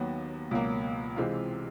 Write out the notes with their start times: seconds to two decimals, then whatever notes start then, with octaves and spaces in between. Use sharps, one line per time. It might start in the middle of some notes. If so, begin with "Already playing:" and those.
Already playing: D#2 D#3 F#3 B3
0.51 C#2 B2 F#3 A#3
1.16 C3 E3 G#3 C4 F4